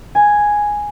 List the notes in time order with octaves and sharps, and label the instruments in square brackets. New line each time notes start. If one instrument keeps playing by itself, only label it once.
[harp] G#5